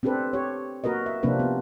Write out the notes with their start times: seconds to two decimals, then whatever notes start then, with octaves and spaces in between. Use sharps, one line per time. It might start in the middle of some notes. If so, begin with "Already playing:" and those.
0.03 C4 D4 G4 A4 B4
0.33 G4 C#5
0.84 A#3 F#4 A#4 B4 D#5
1.06 E5
1.23 C3 F3 A#3 C4 D4 B4
1.39 B3